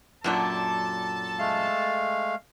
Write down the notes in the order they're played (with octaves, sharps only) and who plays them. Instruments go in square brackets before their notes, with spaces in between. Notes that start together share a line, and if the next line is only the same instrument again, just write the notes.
[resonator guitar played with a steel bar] F#2 A#2 D4 [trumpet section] A4 A5
[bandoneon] G#3 A3 F5